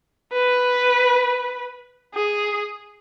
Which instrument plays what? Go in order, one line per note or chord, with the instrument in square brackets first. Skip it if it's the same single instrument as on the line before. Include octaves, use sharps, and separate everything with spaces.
[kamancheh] B4
G#4